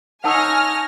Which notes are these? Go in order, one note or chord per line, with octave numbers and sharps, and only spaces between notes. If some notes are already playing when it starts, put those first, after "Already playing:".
D#4 C#5 F#5 G#5 A5 E6 F6 A#6